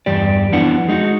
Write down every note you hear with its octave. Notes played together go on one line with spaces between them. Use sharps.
E2 G2 G4 D5
F2 B3 D4 E4 F#5
G#3 D#4 F#4